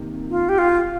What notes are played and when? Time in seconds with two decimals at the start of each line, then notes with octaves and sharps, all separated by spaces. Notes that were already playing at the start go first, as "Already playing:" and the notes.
Already playing: C3 D#3 A#3
0.30 F4
0.49 G4
0.58 F4